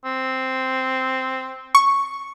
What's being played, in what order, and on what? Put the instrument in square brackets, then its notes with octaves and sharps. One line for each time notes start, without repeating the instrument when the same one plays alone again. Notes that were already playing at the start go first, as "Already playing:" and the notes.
[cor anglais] C4
[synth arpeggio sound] C#6